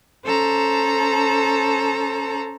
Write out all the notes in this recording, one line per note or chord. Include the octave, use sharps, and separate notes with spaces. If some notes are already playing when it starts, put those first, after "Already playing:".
C#4 A4 C5 A5 A#5